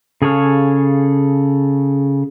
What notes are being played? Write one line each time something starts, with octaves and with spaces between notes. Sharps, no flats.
C#3 G#4 A4 C#5 F5